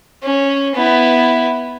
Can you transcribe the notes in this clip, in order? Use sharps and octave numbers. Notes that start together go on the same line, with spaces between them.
C#4
B3 E4